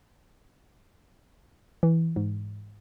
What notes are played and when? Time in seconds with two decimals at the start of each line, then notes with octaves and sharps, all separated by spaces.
1.83 E3
2.16 G#2